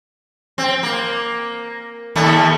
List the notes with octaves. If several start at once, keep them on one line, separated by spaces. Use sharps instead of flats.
C4
A#3
D#2 A3